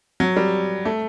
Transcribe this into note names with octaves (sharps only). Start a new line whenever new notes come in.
F#3
G3
A3